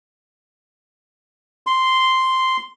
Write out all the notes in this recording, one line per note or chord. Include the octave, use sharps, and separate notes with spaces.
C6